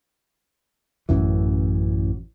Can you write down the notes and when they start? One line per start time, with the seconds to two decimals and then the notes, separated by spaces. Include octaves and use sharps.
1.09 A1 F#2 E3